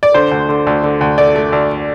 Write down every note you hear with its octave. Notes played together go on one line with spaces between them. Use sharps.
D5
D3 C5
D2
D3
D2
D3
D2
A3 D5
A3
D2